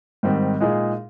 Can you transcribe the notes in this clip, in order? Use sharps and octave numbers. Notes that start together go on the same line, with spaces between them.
G#2 D#3 G3 C4 D#4
A#2 G#3 D#4 G#4